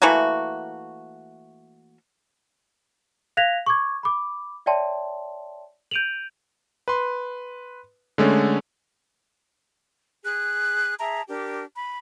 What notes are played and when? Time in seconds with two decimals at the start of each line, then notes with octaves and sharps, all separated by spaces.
0.02 E3 A3 A#3 F#4
3.37 F5 F#6 G#6 A#6 B6 F7
3.66 C#6 D6 G#6
4.03 B5 D6
4.66 C#5 D5 E5 G5 A5 C6
5.91 G6 D7 D#7 F7 F#7
6.88 B4 C6
8.18 D3 G#3 A3 C#4
10.24 G#4 F#6
10.99 G#4 E5 A5 A#5
11.28 D4 G4 A#4
11.76 B5